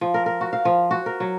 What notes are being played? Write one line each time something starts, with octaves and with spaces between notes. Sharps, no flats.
F3
A#4
A#4
F#4
F5
F3
F#4
A#4
F#3